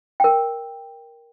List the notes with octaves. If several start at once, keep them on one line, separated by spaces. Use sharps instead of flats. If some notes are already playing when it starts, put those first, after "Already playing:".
A#4 G5